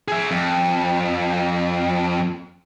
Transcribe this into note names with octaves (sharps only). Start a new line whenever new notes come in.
G#4 E5
F2